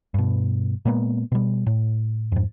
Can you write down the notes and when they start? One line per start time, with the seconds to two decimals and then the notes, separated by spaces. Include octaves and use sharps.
0.14 G2 B2
0.85 A#2 G#3 A#3 B3
1.32 B2 G3
1.66 A2
2.32 F2 G#2